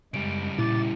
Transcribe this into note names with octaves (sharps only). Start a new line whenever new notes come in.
F#2 C#3 G3 G#3 D7
A#2 E4 D6 A6